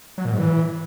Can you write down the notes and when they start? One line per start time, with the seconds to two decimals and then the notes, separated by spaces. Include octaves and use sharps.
0.18 F#3
0.25 A#2
0.32 G#2
0.39 E3